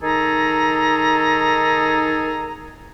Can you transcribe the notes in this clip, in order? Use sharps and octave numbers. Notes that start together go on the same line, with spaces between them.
D#3 D#4 G#4 A4 A#5